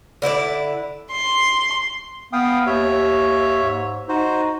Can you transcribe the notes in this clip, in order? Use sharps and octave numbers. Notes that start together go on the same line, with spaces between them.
D3 E4 C5 D5
C6
B3 F5 G5 D#6
D#2 C#5 E5
G#2
D#4 F#4 C5